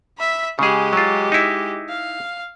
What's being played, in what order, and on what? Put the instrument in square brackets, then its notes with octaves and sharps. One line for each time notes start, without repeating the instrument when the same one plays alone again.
[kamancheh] E5 B5
[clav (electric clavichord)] C#3 G#4 [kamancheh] G#3 G4
[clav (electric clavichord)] F#3 F4
D#4 E4
[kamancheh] F5